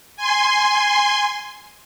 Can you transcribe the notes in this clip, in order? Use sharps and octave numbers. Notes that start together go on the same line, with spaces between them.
G#5 C6